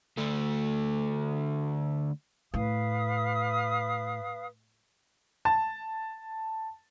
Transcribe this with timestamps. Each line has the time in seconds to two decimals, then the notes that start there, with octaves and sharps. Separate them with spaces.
0.17 D2 A3
2.54 A2 B4 F5 D#6
5.45 A5